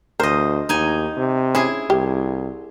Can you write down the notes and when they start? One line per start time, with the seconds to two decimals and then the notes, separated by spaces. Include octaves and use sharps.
0.20 D2 A#4 C5 D#5
0.69 D#2 D#4 G#5
1.17 C3
1.55 C#4 E4 G#4
1.90 C2 G4